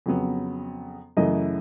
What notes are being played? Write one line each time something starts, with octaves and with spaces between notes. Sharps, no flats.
F2 C#3 F#3 B3
F#2 C#3 E3 A3 D#5